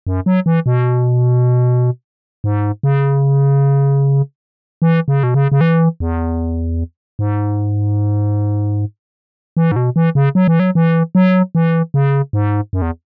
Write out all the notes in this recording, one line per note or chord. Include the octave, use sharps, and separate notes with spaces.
F#2
F#3
E3
B2
G#2
C#3
E3
C#3
B2
C#3
C#3
E3
E2
G#2
E3
G#2
B2
E3
C#3
F#3
E3
F#3
E3
F#3
E3
C#3
G#2
F#2
E2